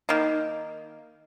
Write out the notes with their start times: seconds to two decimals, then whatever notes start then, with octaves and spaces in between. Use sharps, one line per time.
0.09 D#3 A#3